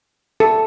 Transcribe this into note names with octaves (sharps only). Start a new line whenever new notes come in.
A4